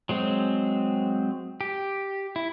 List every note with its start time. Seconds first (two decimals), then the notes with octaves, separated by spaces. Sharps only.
0.09 F#3 G#3 C4
1.61 G4
2.36 E4